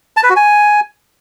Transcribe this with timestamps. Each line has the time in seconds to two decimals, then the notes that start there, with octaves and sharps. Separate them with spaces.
0.17 A5
0.23 B4
0.30 F#4
0.36 G#5